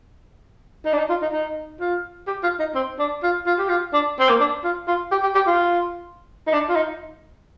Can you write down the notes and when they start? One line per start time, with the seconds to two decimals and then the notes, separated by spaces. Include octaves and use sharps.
0.85 D#4
0.93 D4
0.98 D#4
1.10 F4
1.22 D#4
1.33 D#4
1.80 F4
2.27 G4
2.43 F4
2.59 D#4
2.75 C4
2.99 D4
3.23 F4
3.46 F4
3.58 G4
3.69 F4
3.93 D4
4.19 C4
4.29 A#3
4.40 D4
4.64 F4
4.87 F4
5.11 G4
5.23 G4
5.34 G4
5.47 F4
6.47 D#4
6.53 D4
6.69 F4
6.76 D#4